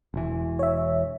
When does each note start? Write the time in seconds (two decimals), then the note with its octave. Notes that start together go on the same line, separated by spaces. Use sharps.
0.14 E1 E3
0.59 C#5 E5